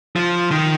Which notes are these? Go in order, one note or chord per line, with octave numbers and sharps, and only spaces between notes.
F3
D#3